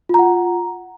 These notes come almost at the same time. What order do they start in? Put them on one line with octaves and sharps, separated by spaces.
F4 A#5 F#5